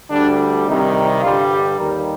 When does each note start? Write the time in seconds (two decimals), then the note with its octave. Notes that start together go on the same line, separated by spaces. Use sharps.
0.11 D2 D3 G3 D4
0.67 C2 C3 D#3 G3 D#4
1.23 G2 D3 G3 F4
1.51 G4
1.79 D#2 D#3 G3 A#4